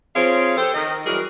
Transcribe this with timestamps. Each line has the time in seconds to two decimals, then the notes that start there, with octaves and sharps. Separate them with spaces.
0.16 F3 C4 G#4 C5 C#5 F5
0.57 G4 A4 C5
0.74 D#3 D#5
1.05 E3 F#3 G3 G#4 A#4